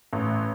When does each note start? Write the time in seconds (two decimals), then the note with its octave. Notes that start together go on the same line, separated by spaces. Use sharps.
0.13 A1